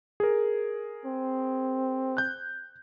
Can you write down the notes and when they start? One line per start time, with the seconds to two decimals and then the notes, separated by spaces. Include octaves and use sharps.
0.20 G#4 A#4
1.06 C4
2.17 F#6 G6